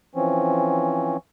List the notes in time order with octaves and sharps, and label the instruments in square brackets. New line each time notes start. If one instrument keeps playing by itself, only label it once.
[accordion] E3 F3 C4 C#4